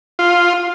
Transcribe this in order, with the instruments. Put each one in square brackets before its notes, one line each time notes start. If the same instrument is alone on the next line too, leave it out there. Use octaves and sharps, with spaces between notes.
[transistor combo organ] F4